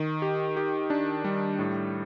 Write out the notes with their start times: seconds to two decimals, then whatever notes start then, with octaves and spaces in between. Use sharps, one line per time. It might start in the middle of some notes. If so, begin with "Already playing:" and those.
Already playing: D#3
0.22 G4
0.57 G4
0.90 D4
1.24 G3
1.59 A2